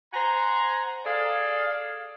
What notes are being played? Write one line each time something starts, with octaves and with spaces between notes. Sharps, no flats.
C5 F#5 G#5 A#5
G#4 A4 D5 F5